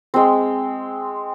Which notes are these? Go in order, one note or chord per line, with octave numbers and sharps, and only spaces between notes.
G#3 C4